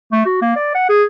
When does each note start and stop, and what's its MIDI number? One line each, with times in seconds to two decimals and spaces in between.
0.12 0.23 57
0.26 0.42 66
0.42 0.54 58
0.56 0.73 74
0.75 0.85 78
0.89 1.04 68